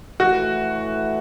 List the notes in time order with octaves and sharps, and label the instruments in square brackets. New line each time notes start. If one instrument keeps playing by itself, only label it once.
[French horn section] A2 E3 A3 [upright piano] F#4